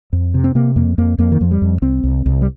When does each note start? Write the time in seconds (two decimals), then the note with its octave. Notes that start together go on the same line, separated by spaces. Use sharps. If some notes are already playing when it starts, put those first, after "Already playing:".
0.13 F2
0.34 C3
0.44 C4
0.55 C3 A#3
0.76 F2 A#3
0.98 F2 A#3
1.18 F2 A#3
1.32 D#3
1.41 F2 F3
1.51 G3
1.62 F2
1.82 C2 C4
2.04 C2
2.26 C2
2.42 G3